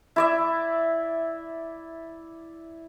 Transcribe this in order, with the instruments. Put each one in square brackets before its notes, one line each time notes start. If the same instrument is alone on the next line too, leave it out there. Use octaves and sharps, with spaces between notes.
[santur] E4 D5 E5